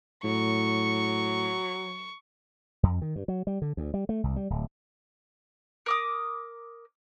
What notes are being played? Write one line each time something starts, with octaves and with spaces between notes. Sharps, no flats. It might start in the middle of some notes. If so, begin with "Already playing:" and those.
A2 F#3 C#6
F2
D#3
G2
F#3
G3
D3
D2
G3
A3
C2
G3
D1
A#4 D6 D#6